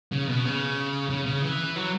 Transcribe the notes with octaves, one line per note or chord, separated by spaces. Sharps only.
C#3
B2
C#3
C#3
C#3
E3
F#3